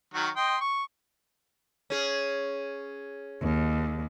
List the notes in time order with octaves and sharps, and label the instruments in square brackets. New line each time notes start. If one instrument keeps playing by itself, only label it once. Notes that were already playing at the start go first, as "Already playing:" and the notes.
[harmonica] D#3 F#3 F#4
D#5 G5 C6
C#6
[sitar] C#4 G#4
[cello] D#2